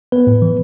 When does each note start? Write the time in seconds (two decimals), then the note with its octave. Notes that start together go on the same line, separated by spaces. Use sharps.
0.12 B3 B4
0.27 A2
0.42 E3